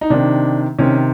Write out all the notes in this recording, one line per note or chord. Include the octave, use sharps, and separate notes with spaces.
D#4
C3 D#3 D4
C3 D#3 C#4